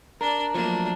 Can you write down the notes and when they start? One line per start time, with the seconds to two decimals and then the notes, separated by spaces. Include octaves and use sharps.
0.21 D4 A#4 D5
0.54 F3 F#3 A3 A#3 D4